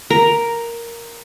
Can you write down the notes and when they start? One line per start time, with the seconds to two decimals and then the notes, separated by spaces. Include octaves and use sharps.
0.10 A#4